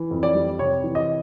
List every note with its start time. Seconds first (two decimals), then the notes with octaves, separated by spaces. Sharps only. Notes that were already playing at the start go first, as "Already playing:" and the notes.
Already playing: E3
0.11 F2
0.23 D5
0.35 G3
0.59 C3 C#5
0.83 E3
0.95 D#5